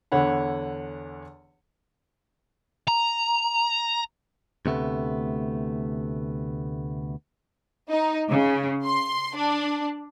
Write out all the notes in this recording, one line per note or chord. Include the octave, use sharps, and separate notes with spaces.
E2 D3 C#5 F#5 B5
A#5
D2 C3 A3 B3
D#4
C#3
C6
D4